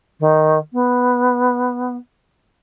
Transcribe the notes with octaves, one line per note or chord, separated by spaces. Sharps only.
D#3
B3